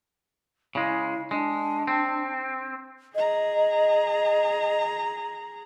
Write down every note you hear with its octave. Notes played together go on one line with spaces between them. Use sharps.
C#3 G#3 E4
G#3 D4
C4
G#4 D#5 A#5